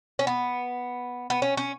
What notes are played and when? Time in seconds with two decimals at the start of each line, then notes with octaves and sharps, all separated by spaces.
0.19 C#4
0.27 B3
1.30 B3
1.42 C#4
1.57 C#4